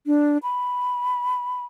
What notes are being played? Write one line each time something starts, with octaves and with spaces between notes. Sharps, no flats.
D4
B5